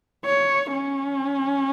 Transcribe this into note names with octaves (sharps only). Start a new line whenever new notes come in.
C#5
C#4